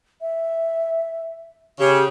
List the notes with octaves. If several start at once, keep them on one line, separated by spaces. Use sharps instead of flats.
E5
C#3 G4